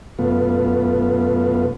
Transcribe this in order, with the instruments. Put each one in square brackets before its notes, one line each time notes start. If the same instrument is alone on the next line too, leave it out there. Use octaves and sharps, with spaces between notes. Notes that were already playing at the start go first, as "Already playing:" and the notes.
[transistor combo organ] F#2 B2 A3 B3 F4